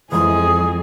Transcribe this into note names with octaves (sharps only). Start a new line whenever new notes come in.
F2 E3 F3 G#3 G#4 D#6